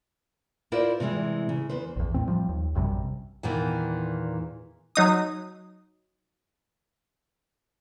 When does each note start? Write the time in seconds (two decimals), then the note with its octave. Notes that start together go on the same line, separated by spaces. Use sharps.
0.72 E4 F4 A#4 C5 D5
1.00 C3 E3 G3 G#3
1.49 C#3
1.70 E2 B4 C5
1.96 A#1 E2
2.14 A2 C4
2.28 F3 G3
2.49 D#2
2.75 A#1 F#2 C3 G3
3.43 E2 A#2 D#3 E3
4.96 F#3 D#4 D#6